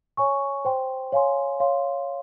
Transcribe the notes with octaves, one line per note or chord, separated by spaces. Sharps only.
C#5 G#5 C#6
C5 G5 C6
C#5 F5 G#5 C6
C#5 F5 C6